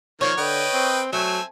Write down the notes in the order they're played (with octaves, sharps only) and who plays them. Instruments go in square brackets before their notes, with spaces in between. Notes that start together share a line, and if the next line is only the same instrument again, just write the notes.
[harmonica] D#3 A#3 [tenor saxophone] F3 [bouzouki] C#5
[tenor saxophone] D3 [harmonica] B4 D#5 G5
[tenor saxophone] C4
[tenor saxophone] F#3 [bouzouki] A3 [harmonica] C4 E5 G#5